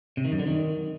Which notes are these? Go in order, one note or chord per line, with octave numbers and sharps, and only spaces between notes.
C3
D#3
F#2
D3
D#3